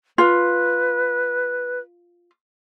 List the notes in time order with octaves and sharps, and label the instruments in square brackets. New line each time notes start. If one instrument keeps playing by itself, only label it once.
[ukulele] F4 [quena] B4